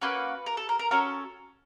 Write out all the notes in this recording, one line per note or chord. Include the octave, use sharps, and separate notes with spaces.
A#3 C#4 F#4 B4
A#4
A4
A#4
A#4
C#4 F#4 A4 A#4